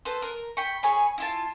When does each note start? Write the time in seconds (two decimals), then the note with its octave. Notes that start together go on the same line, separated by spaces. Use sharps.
0.05 A4 B4 C5
0.22 A#4
0.57 G5 B5 C#6
0.83 G#4 C#5 G#5 B5
1.18 E4 F4 A5